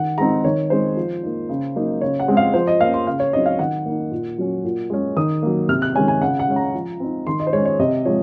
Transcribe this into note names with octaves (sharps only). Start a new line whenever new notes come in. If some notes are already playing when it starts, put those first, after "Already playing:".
Already playing: D#3 F#5
G#3 C4 D#4 A#5
D#3 C#5
G#3 C4 D#4 C5
F3
A#3 D#4
C#3
F#3 A#3 D#4
C#3 C#5
F#5
G#3 C4
F5
F3 C5
D#5
A#3 C#4 F5
C6
C#3 F5
C#5
F#3 C4 D#4 D#5
F5
D#3 F#5
A#3 D#4
A#2
F#3 C#4
A#2
G#3 C#4
D#3 D#6
F#3 A#3
C3 F6
F#6
D#3 G#3 C#4 G#5
G#5
C#3 F#5
F#5
G#3 C#4
A#5
F3
C4 D#4
D#3 C6
D#5
C5
G#3 C#4 C#5
C#5
C3 D#5
F3 G#3 C#5